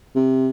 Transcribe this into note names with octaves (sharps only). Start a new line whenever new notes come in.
C3